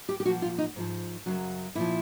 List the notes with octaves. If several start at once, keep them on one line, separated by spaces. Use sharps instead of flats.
G4
G4
A#2 F3 F#4
F4
D#4
G#2 F3
F#2 C#3 F#3
A#2 F3 E4